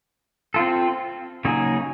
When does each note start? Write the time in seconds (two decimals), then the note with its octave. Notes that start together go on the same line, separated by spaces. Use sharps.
0.54 C4 F4 A4
1.45 C#3 F#3 A#3 D#4 G#4